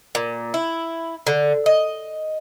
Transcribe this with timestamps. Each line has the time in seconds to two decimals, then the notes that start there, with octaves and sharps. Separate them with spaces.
0.15 A#2
0.54 E4
1.27 D3
1.66 D#5